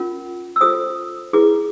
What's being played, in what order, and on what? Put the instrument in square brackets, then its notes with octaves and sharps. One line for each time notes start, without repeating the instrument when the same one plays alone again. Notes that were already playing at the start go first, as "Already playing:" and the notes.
Already playing: [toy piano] C#4 F4 A#4
E6
F4 A4 C5 D#6
E4 G#4 B4 D6